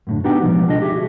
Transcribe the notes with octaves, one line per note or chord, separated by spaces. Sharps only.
F#2 A2 D3
B3 D4 D#4 F#4 G4 G5
B2 F3 G3 G#3 B3
C#2 D4 F4 A4 D#5
G4 G#4 E5
F#4